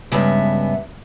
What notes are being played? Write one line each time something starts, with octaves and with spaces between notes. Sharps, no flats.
G2 C#3 G#3 B3 E5